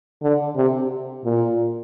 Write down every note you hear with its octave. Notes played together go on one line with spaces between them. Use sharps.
D3
C3
A#2